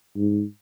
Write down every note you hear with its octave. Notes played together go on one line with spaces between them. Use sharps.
G#2